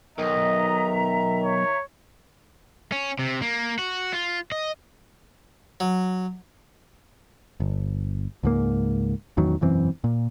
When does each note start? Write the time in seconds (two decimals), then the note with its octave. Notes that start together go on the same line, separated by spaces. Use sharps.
0.18 B1 D#3 D#5 E5 A#5
1.44 C#5
2.92 C#4
3.19 C3
3.42 A#3
3.79 F#4
4.13 F4
4.52 D#5
5.80 F#3
7.60 G1
8.43 C#2 G#2 A#3
9.37 A1 E2 D#3 F#3
9.61 E1 F#2 E3 C4
10.04 A#2